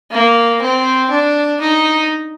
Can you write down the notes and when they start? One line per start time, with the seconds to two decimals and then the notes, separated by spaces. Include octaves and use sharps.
0.11 A#3
0.62 C4
1.10 D4
1.61 D#4